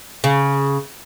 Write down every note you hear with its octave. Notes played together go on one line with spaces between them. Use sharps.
C#3